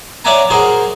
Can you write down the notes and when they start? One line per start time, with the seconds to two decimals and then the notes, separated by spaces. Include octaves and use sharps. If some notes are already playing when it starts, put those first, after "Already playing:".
0.24 C#5 D5 E5 F#5 G#5 A#5
0.50 F#4 G#4 A#4 C5